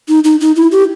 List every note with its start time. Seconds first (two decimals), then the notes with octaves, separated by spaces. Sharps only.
0.08 D#4
0.24 D#4
0.41 D#4
0.56 E4
0.72 G4